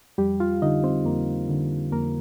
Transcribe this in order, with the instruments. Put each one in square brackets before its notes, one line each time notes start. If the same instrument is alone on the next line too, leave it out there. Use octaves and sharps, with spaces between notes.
[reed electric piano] F2 G3 G4
F4 F5
D3 D#4 D#5
C4 C5
F2 A#3 A#4
D3
F2 A#3 A#4